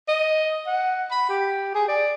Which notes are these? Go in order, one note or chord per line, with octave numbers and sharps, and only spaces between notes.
D#5
F#5
B5
G4
G#4
D5